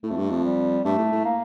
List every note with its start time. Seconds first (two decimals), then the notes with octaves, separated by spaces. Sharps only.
0.03 A2 A3
0.11 F2
0.17 G2
0.30 F2
0.44 G3
0.84 G2 A3
0.98 A2
1.12 A2
1.25 A#3